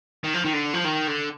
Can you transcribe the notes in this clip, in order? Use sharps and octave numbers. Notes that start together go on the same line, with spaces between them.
D#3
F3
D#3
D3
F3
D#3
D3